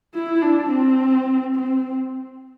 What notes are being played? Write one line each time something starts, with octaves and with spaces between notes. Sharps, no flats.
E4
D4
C4
C4